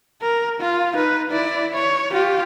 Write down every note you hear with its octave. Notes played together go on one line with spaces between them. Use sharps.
A#4
F4
D#4 B4
E4 D5
C#5
F4 G4